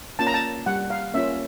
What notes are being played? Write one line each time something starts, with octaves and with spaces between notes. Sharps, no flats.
A#3 C#4 F4 A5
A#5
A5
G3 F#5
F5
A#3 C#4 F4 E5